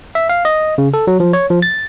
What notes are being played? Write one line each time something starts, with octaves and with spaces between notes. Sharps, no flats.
E5
F5
D#5
C#3
A4
F#3
F3
C#5
F3
A6